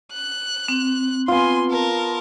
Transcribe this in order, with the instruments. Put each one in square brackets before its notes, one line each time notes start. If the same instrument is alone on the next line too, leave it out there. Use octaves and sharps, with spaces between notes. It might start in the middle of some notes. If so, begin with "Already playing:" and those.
[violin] F#6
[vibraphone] C4
[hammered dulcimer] B3 F4 [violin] G#5 C6
[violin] A#4 A5